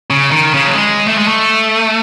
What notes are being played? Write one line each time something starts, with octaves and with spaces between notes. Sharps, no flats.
C#3
D#3
C#3
F#3
G#3
A3
G#3
A3